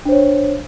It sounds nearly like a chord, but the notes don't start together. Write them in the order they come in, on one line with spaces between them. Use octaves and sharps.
D4 C5 C#5